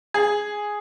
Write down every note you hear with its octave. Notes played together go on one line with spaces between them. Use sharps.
G#4